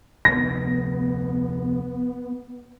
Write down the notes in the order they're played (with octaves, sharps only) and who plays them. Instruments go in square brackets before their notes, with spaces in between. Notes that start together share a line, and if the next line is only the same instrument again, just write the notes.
[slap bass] F1 D2 [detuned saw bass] B3 [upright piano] A#6